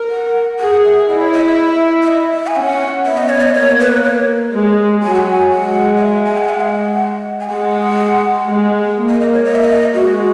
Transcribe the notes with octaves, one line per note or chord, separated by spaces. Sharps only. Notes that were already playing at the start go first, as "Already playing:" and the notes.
Already playing: A#4
F#5
G#4 F#5
E5
E4 D#5
C#5
D#5
E5
E5
D#5
E5
G#5
C#4 F#5
B3 E5
D#5
C#5
D#5
A#3 C#5
B4
C#5
G#3
F#3 G#5
F#5
G#5
G#3 F#5
D#5
E5
G#5
F#5
E5
F#5
G#5
G#3 F#5
G#3
A#3
D#5
D#5
C#5
D#5
E5
D#5
G#3 F#4